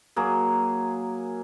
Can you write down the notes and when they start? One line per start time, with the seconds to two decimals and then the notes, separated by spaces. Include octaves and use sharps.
0.16 F#3 A#3 G#4